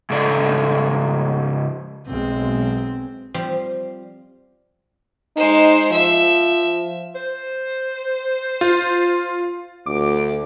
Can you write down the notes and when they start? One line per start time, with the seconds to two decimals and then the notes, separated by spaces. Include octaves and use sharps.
0.10 G#2 C#3 A4 D5
2.07 B1 B2 G#3 C4
3.34 F3 G3 C4
5.37 G#3 D#4 C5
5.92 F3 E5
7.15 C5
8.61 F4
9.86 D2 D6